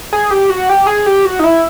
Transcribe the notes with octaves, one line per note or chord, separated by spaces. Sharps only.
G#4
G4
F#4
G4
G#4
G4
F#4
D#4
E4